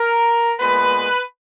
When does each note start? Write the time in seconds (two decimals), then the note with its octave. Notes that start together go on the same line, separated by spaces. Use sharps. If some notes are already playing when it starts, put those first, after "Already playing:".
Already playing: A#4
0.59 A#2 G#3 B3 B4